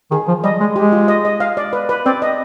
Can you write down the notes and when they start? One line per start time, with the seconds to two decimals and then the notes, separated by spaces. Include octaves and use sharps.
0.11 D#3 G#4
0.28 F3
0.44 G3 D#5
0.60 G#3
0.75 G#3 G4
0.92 F4
1.08 D#5
1.25 D#5
1.40 F5
1.57 D5
1.73 B4
1.89 B4
2.06 C4 D5
2.22 D#5